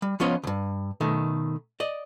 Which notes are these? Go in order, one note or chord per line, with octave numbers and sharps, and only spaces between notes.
G3
F3 B3 C#4 F4 C#5 D#5
C#2 G2
B2 D#3 A3
D5 D#5